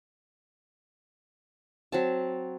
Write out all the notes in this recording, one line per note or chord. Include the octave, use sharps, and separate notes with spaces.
F#3 C4 A5